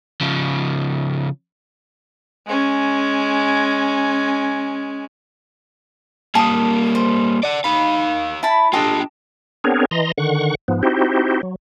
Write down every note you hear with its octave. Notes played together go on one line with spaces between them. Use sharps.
C#3 F3
G#3 C#4
G3 A#3 A5 D#6
C5
D5 F#5
D#4 F5 B5
E4 A5 B5
D4 F4 G4 A4 D#5
B3 C4 D4 G#4 A#4 C#5
E3 D#5 A#5 C6
D3 D#3 F#5 C#6
G#2 F3 B3
C4 D#4 E4 F#4 G4 C5
F#3